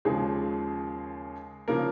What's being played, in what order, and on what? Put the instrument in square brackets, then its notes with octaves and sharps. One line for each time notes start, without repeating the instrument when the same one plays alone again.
[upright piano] D#2 C#3 F3 G#3 G#4
C#3 F3 A#3 A#4